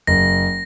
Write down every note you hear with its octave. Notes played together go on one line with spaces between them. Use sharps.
F#1 A#6